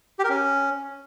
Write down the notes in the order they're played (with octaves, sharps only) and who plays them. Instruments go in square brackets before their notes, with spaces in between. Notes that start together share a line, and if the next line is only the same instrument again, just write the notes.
[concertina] G4
A#4
C#4